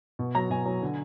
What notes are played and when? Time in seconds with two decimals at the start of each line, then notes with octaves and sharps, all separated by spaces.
0.19 B2
0.35 F#3 A#5
0.50 B2 G#5
0.66 F#3
0.82 D3